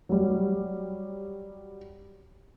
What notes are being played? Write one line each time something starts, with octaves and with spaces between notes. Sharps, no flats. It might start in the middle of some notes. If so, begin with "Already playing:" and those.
F#3 G3